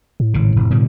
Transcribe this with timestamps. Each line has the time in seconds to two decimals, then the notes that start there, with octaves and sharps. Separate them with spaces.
0.20 A2
0.34 G#1 C#3
0.56 F1
0.70 B2 D3 G3